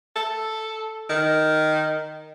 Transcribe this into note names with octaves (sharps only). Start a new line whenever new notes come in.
A4
D#3